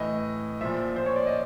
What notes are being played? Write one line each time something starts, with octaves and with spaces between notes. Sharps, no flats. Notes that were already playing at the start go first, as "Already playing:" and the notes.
Already playing: A2 E3 D#5
A#2 F3 E5
C5
C#5
D5
D#5